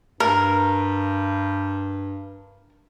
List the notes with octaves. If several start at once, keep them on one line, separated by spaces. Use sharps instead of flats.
G2 A#4